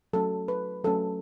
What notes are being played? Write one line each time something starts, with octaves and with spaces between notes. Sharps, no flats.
F#3 A3 C#4 A4
B4
F#3 A3 C#4 A4